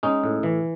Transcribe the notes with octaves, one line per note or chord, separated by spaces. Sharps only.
G#3 C#4 D#4
A2
E3